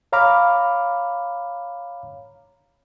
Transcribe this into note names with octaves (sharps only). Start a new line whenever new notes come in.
C#5 F5 A#5 B5 D6 F6